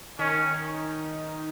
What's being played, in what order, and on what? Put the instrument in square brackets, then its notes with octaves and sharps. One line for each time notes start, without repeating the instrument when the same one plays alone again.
[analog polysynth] D#3 [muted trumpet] C#4